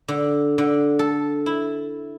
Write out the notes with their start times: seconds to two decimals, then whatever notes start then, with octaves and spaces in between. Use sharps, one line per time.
0.08 D3
0.58 D3
0.99 A4
1.46 E4